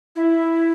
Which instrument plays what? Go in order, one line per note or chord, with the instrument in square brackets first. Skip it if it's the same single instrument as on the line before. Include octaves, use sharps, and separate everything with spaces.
[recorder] E4